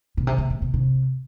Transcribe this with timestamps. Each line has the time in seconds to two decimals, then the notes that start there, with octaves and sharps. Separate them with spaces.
0.17 B2
0.27 C3
0.38 B2
0.50 A#2
0.62 B2
0.74 C3